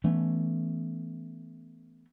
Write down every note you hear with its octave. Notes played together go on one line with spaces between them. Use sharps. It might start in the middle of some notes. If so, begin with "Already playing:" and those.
E3 A3 B3 C#4